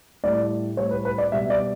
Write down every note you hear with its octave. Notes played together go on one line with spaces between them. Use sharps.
A2 G3 D5
A2 G3 C#5
B4
B4
D5
B2 G3 E5
D5